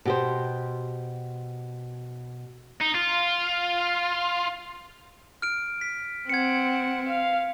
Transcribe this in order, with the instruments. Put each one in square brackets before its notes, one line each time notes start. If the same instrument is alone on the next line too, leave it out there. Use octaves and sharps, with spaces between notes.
[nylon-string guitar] B2 G4 C5
[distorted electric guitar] D#4
F4
[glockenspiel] F6 D7
B6
[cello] C4 [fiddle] F#5 [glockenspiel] G#6 C#7
[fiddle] F5